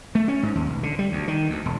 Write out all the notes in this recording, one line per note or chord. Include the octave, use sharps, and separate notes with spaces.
A3
C#4
G#2
D#2
B1
D3
G3
D2
D#3
D2
E1